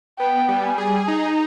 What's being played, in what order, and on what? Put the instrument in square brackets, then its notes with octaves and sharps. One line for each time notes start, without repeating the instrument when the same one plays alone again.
[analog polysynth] B3 [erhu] G5
[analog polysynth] G3
[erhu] G#5
[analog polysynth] G#4
[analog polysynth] D#4 [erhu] A#5